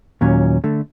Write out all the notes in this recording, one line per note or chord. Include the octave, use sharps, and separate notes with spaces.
D#2 A#2 F#3 C#4
D3 A3